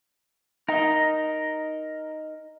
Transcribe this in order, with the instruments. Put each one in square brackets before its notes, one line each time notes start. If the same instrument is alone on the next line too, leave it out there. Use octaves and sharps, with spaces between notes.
[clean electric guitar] D#4 [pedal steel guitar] A#4 D#5